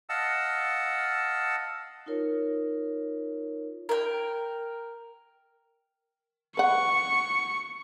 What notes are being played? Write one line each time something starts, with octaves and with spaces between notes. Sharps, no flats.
D#5 F5 F#5 A5 E6
D#4 F4 A#4 C#5
A#4 G5
B4 F#5 C#6